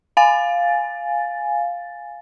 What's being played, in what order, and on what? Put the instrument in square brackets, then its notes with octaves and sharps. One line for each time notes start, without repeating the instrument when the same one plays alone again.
[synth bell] F5 G#5 A6